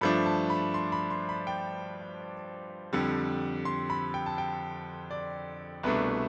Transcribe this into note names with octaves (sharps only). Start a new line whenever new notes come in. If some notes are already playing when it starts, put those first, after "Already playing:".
G2 F3 A3 D4 B5
A5
B5
C6
B5
C6
B5
G5
F2 D3 G3
C6
B5
G5
A5
G5
D5
C2 B2 A3 D4 B4